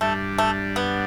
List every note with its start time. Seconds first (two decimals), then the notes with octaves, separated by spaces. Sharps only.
0.01 G2 G3 A3 D4
0.38 A3
0.76 B3